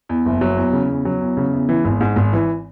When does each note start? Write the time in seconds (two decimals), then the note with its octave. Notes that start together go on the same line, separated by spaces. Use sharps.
0.09 E2
0.26 F#1
0.41 F#3
0.57 E2
0.73 C#3
0.89 E2
1.05 F#3
1.21 E2
1.37 C#3
1.53 E2
1.69 E3
1.85 G#1
2.01 G#2
2.16 G#1
2.33 E3